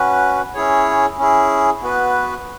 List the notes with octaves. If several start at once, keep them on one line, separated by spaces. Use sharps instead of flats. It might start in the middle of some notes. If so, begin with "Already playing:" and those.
Already playing: C#4 F#4 B4
C#4 E4 G#4 C#5
C#4 E4 G#4
B3 F#4 B4